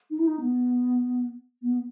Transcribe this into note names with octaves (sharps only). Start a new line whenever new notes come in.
D#4
E4
D#4
B3
B3